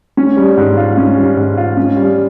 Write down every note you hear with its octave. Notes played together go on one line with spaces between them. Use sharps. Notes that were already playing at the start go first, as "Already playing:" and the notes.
C#4
G3
G#2
F4
C#4
G3
G#2
F4
C#4
G3